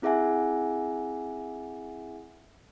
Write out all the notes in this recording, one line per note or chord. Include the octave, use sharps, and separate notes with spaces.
C4 E4 G#4 E5 F#5 G#5